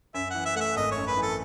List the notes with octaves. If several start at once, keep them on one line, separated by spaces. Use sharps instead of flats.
F#2 E5
E3 F#5
E5
A3 F#5
E5
G#1 D#5
C#5
F#2
B4
E3
A4